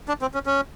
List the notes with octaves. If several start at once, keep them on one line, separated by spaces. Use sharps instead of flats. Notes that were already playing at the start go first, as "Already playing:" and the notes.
D4
C4
C#4
C#4